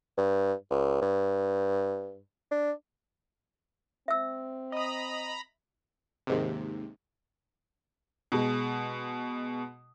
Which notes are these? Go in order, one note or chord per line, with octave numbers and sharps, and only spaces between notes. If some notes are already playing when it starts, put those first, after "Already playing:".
G2
C#2
G2
D4
C4 E5 E6
D#5 A#5 B5 D#6
D#2 G#2 C3
B2 G#3